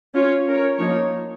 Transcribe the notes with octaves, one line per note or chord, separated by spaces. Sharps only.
C#4 F4 C#5
C#4 A#4 C#5
F3 A#3 D#4 C#5